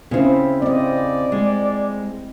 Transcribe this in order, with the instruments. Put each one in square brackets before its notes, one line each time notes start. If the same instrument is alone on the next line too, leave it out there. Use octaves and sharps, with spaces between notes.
[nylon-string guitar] C#3 C5 [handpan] C4 E4
[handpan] C4 D#5 [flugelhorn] D5
[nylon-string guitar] G#3